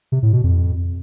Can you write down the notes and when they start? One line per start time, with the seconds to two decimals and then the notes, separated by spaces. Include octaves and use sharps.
0.12 C3
0.23 A2
0.33 B2
0.44 F2